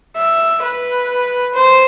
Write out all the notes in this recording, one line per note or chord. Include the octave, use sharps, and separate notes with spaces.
E5
B4
C5